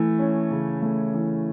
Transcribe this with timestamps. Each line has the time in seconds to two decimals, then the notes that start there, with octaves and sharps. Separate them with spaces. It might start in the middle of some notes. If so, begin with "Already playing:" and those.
Already playing: E3 A3
0.19 C#4
0.51 C#3
0.82 A3
1.14 E3